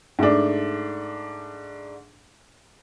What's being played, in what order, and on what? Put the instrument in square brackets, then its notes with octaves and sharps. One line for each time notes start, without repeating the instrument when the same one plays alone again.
[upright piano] G#2 A3 D4